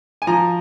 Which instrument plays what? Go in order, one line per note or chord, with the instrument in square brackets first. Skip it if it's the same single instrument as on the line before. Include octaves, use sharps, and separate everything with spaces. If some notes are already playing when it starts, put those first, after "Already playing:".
[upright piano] G#5
F3 A#5